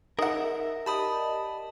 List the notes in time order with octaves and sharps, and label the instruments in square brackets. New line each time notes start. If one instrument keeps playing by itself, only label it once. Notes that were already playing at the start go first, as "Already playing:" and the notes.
[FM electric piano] D#4 E5 [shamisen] G#4 F#5 [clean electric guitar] A#4
[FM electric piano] G4 D5 D#5 [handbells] A5 B5 D#6